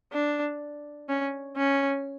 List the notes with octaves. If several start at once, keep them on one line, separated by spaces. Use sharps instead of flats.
D4
C#4
C#4